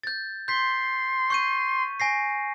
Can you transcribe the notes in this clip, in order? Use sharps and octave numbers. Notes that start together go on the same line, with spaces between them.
G6 A6
C6 G6 B6
C#6 G6 D#7
G#5 A#6 C7